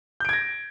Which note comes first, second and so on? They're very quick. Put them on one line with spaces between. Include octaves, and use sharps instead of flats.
G6 D7 G#6 A#6